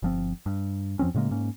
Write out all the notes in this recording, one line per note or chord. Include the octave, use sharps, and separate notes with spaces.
G1 F3 C4
G2
F2 F3 C4 C#4
A2 C#3 G#3 A#3
G#2 A#3 C#4